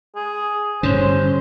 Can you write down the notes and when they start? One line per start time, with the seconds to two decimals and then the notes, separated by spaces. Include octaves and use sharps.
0.16 G#4
0.83 G2 D3 C#4 C5